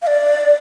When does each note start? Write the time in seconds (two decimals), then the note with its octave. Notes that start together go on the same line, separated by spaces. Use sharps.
0.02 F5
0.07 D5